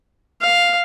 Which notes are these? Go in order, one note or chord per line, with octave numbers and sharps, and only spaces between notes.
F5